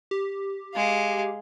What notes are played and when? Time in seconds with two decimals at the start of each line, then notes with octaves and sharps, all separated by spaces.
0.11 G4
0.75 G#3 F5